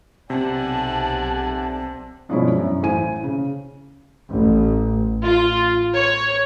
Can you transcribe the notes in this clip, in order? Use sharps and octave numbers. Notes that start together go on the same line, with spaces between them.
B1 C3 D5 F#5 G#5 A5
G2 B2 F3 G#3 C#4 E4
F#2
A1 C5 G#5 D#7
C#3
A1
F4
C#5